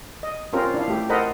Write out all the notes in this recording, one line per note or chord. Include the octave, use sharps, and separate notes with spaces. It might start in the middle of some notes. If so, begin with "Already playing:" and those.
D#5
C4 C#4 F4 G4 A#4 C5
D4 E4 F5
A3 G4
A4 A#4 C5 D#5 F#5 B5